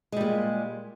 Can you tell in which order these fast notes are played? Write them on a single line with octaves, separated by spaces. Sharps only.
G#3 G3 A#2